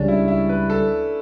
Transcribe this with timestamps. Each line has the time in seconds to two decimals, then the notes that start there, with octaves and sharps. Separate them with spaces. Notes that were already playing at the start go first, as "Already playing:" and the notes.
Already playing: C#2 C#3 G3 C#4 D4
0.08 E4
0.28 E4
0.49 B4
0.70 A4